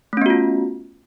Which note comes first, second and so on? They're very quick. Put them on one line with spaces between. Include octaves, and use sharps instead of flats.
A3 C#4 B3 F#4 F4